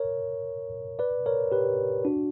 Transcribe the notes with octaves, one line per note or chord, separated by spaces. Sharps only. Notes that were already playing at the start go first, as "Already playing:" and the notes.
Already playing: A#4 C#5
B4 D5
A#4 C#5
G4 B4
D4 F#4